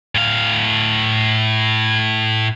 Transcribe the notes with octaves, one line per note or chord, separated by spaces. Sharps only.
A2 F5